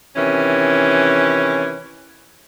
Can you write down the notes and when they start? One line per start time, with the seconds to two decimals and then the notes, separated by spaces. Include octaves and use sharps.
0.16 C3 D#3 E3 C#4